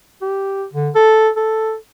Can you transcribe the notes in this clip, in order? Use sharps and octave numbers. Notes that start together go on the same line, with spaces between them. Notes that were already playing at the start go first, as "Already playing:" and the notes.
G4
D3
A4
A4